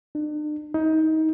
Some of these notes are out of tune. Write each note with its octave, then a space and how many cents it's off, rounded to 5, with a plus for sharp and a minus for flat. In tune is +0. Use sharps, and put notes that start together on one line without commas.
D4 +45
D#4 +25